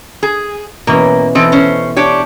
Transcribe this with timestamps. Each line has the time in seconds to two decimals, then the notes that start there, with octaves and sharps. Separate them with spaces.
0.23 G#4
0.87 B2 E3 A#3 C#4
1.35 E3 C4 A4 D#5
1.52 C#4 C5
1.96 D4 G4 C#5